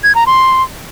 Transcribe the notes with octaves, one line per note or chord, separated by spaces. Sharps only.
G#6
A#5
C6